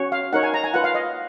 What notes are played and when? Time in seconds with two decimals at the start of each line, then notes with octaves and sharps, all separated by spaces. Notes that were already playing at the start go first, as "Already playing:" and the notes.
Already playing: C#4 F#4 C#5
0.12 F5
0.33 D#4 A#4 C#5 F#5
0.43 G#5
0.54 A#5
0.64 G#5
0.74 F4 B4 F#5
0.84 F5
0.95 D#5